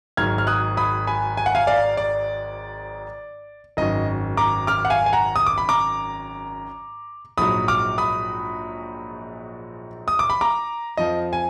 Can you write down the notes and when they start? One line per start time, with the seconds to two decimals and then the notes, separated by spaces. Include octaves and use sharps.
0.17 G#1 G#2 F#3 F6 G#6
0.38 F6
0.47 D#6 F#6
0.77 B5 D#6
1.07 G#5 B5
1.37 G#5
1.46 F#5
1.55 F5 G#5
1.67 D5 F5
1.97 D5
3.77 G#1 F#2 D#3 F#3 D#5
4.37 A#5 D6
4.67 D6 F6
4.85 F#5
4.90 F5 G#5
5.06 G#5
5.13 F#5 A#5
5.36 D#6
5.46 D6
5.58 B5
5.69 A#5 D6
7.38 A#1 G#2 F#3 B5 D#6
7.68 D6 F6
7.98 B5 D#6
10.08 D#6
10.19 D6
10.30 B5
10.41 A#5 D6
10.97 F2 F3 D#5
11.33 G#5